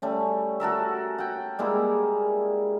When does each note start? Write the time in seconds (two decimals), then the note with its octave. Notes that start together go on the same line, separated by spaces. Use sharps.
0.02 G3 A3 C#4
0.60 F#4 A4 A#4 E5
1.18 F#5 G5
1.59 G3 G#3 A#3 E4